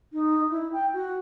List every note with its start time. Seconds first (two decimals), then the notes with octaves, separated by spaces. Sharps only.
0.12 D#4
0.50 E4
0.72 G5
0.93 F#4